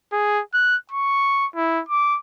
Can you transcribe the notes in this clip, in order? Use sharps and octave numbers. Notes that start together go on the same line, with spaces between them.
G#4
F#6
C#6
E4
D6